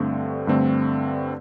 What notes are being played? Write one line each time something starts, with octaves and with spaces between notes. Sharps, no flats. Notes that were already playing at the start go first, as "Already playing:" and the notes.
Already playing: G2 D3 A3 C4
G2 D3 A3 C4